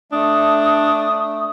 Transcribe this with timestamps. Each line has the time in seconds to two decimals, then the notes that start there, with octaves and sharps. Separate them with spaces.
0.12 A3 D4 D#6